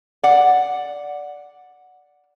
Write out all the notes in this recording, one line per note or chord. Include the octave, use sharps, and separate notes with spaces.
D5 F#5